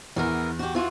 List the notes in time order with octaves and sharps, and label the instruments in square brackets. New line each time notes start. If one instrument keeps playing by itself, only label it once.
[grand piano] E2 [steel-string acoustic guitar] E3 B3 A#4
[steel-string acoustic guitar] F#4 G4
E3 F4 F#4